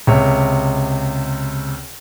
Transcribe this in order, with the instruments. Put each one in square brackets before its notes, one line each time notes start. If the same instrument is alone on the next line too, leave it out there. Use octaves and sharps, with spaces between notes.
[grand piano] C#2 C3 C#5